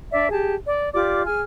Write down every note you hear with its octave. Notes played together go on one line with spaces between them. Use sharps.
D4 D5 E5
G4 G#4 A5
D5
F4 G4 D5 D6
G#4 G#5 F6